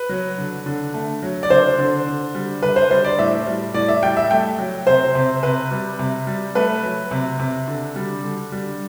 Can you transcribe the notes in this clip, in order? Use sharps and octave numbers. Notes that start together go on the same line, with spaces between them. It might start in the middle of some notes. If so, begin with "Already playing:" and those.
Already playing: B4
F#3
D3
D3
A3
F#3
D5
D3 C5
D3
D3
G3
D3 B4
C5
G3 C5
D5
A2 E5
G3
A2 D5
E5
G3 G5
E5
A3 G5
F#3
C3 C5
C3
C3 B4
G3
C3
G3
A3 B4
F#3
C3
C3
D3
G3
D3
G3